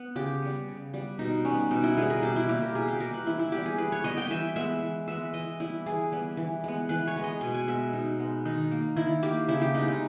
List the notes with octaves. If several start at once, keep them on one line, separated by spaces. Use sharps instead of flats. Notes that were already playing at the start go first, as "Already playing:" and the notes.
Already playing: B3
C#3 G4
G3 B3
C#3
G3 B3
B2 D#4
G3 B3 C#4
B2 D#4
E4
G3 B3 G#4
A#4
B2 G4
E4
G3 A#3 G4
A#4
B2 G#4
G4
G3 A#3 A#4
B4
E3 E4
E4
G3 B3 G4
G#4
E3 B4
C#5
G3 B3 D#5
G5
E3 E5
G#3 B3 E5
E3
G#3 B3 E5
E3 D#5
G3 B3 E4
E3 G#4
G3 B3
E3
G#3 B3
E3 B4
C#5
G#3 B3
D#5
B2 G#5
G#5
G#3 B3 E5
B2 D#4
G#3 B3
D#3 D#4
A#3
D#3 E4
A#3 G4
C#3 E4
G4
G#3 B3 D#4
D#4